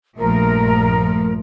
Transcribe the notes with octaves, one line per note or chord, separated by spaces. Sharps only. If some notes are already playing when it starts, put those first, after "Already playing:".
A#1 G2 F3 A3 A#4